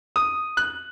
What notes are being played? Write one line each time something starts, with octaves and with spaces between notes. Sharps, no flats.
D#6
F#6